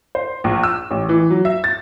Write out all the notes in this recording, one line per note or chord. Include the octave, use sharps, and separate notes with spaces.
C5
A#1
E6
A1
E3
F#3
E5
A6